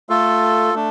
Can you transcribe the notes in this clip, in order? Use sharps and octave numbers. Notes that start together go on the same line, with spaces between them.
A3 F4 A4
A3 D4